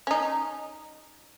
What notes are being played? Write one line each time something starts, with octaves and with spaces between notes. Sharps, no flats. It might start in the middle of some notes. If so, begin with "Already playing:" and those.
C#4 D#4